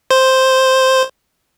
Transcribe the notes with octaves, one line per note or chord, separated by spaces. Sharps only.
C5